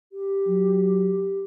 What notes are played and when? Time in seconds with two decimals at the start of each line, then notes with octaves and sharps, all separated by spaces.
0.12 G4
0.48 F#3